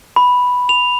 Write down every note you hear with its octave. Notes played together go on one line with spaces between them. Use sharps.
B5
F7